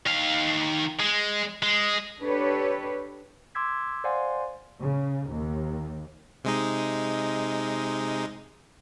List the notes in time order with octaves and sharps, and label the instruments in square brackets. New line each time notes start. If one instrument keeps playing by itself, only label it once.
[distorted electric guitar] D#3 F5
G#3
G#3
[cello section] D4 G4 A4 B4 C#5
[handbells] C6 D6 E6 G#6 B6
C5 D5 F5 F#5 G#5 C6
[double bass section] C#3
D#2
[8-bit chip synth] C3 G#3 D#4